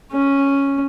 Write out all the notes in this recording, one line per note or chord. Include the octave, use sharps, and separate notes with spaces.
C#4